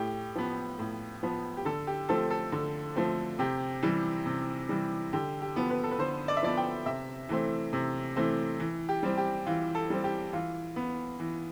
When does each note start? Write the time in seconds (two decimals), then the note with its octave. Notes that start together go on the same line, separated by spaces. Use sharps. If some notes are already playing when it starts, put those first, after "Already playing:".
Already playing: A2 G4
0.35 F3 B3
0.79 A2
1.23 F3 B3
1.57 G4
1.65 D3 A4
1.87 G4
2.09 F3 A3 C4 A4
2.30 A4
2.52 D3
2.96 F3 A3 C4
3.39 C3 G4
3.83 E3 G3
4.26 C3
4.69 E3 G3
5.13 D3 G4
5.42 G4
5.56 F3 B3
5.70 B4
5.84 A4
5.91 B4
5.99 D3 C5
6.28 D5
6.37 E5
6.43 F3 B3 D5
6.57 G5
6.86 C3 E5
7.29 E3 A3 C4
7.73 C3
8.16 E3 A3 C4
8.60 E3
8.89 G4
9.03 G3 C4
9.17 G4
9.46 E3 F4
9.75 A4
9.90 G3 C4
10.04 G4
10.33 E3 F4
10.76 B3
11.20 E3